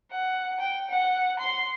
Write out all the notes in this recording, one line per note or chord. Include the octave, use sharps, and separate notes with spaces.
F#5
G5
F#5
C6